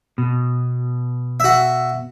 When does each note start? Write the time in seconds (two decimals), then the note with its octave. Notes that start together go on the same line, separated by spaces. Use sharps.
0.18 B2
1.40 F#4 E5